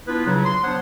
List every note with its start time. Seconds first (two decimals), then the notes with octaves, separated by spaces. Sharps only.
0.08 B3 D4 E4 F4 B4
0.26 C#3 F#3
0.45 C6
0.64 B3 D4 C5 C#5 F#5